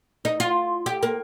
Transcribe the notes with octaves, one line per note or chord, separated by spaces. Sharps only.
D#4
F4
G4
A#3